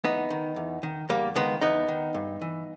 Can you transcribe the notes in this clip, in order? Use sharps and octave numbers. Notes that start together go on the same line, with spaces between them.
E2 B3 D#4
D#3
E2
D#3
E2 G3 A#3
D#3 G#3 B3
E2 B3 D#4
D#3
G2
E3